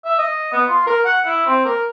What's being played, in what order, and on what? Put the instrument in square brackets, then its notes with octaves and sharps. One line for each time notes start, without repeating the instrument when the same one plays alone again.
[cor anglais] E5
D#5
B3
F4
A#4
F#5
E4
C4
A#4